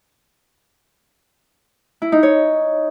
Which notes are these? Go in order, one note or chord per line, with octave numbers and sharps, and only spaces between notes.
E4
D#4
C#5